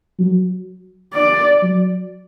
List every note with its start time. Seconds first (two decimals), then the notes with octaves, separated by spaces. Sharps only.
0.18 F#3
1.14 D5
1.62 F#3